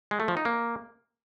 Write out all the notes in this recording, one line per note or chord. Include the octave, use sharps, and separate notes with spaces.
G#3
A3
F3
D#4
A#3